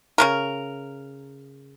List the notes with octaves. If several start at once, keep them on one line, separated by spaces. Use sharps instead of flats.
C#3 G#3 A#4